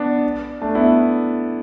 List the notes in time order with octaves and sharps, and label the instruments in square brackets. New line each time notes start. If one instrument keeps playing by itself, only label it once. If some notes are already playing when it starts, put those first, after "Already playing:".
Already playing: [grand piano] B3 D4
A3 D4
B3 E4